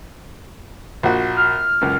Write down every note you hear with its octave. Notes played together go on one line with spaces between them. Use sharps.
A#1 F#4
F6
C#2 F#2